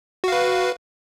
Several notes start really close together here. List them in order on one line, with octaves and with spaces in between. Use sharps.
F#4 F5 B4